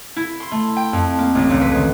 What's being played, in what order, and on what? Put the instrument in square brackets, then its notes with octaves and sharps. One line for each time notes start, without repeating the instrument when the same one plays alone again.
[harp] E4
C6
A3
G5
F2
A#3
A1
C#2
B4
D#3